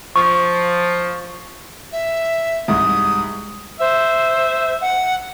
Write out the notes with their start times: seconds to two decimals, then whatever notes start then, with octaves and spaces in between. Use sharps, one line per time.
0.16 F3 C#6
1.92 E5
2.68 C2 G#2 D#6
3.80 C5 E5
4.82 F#5